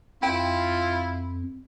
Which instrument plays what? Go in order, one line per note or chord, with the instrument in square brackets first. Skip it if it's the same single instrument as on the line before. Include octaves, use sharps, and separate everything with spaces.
[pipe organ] F2 [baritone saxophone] E4 [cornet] F4 [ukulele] G5